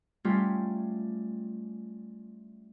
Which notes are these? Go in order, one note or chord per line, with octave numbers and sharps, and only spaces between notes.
G3 A3 C#4 F4 G4